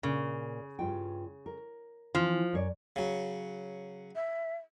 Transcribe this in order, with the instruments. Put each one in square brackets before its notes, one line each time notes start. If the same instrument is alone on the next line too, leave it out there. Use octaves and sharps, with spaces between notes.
[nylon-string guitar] A#2 [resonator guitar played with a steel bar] C#3
[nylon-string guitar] G2 F4 G5
A#4
[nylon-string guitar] E3 C4 [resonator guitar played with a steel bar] F3
[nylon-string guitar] F#2 C#5 D5
[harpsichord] C#3 F#3
[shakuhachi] E5